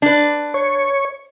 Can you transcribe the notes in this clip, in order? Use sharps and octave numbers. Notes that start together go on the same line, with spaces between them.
D4 B4
C#5